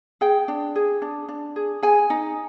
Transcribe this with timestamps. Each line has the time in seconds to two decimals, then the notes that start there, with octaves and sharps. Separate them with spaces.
0.21 G#4 G5
0.48 D4
0.76 G#4
1.02 D4
1.29 D4
1.56 G#4
1.83 G#4 G#5
2.10 D#4